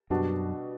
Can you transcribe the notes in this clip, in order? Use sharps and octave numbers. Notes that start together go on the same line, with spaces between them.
F#2 B2 G3 D4 F#4